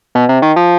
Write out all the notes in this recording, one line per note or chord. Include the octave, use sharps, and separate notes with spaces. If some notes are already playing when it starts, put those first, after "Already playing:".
B2
C3
D#3
F3